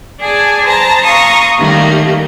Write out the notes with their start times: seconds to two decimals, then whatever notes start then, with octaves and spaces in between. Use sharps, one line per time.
0.20 G#4 D5 G#5 A5
0.65 C5 A5 A#5
1.04 F5 A#5 C6 C#6 D#6
1.57 D#3 G3 A3 A#3